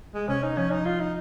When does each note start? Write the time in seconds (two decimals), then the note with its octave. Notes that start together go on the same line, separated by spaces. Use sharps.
0.14 G#3
0.28 C3 C#4
0.43 D#4
0.57 F3 C#4
0.71 D#4
0.85 F4
1.00 D#4